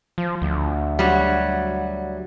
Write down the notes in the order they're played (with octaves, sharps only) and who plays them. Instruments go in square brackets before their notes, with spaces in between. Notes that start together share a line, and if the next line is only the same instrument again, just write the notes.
[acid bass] F3
D2
[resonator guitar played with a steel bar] F#3 G3